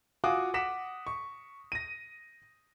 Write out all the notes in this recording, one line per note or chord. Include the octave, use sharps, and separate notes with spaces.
F4 F#4 F5 G#5 D6 D#6
F#5 D6 B6 E7
C#6
A#6 D#7